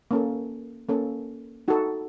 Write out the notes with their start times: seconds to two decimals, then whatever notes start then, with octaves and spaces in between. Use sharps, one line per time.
0.11 A#3 C#4 A4
0.89 A#3 C#4 A4
1.68 D#4 F#4 A4